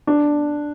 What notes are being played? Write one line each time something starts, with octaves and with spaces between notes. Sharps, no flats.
D4